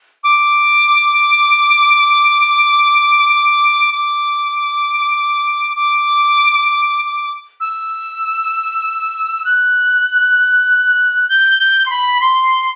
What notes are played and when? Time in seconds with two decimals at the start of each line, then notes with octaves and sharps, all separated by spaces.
0.24 D6
3.92 D6
5.76 D6
7.60 E6
9.45 F#6
11.29 G6
11.59 G6
11.86 C6
11.90 B5
12.21 C6